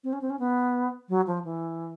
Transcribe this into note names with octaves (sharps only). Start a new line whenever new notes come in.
C4
C#4
C4
C#4
B3
F#3
F3
E3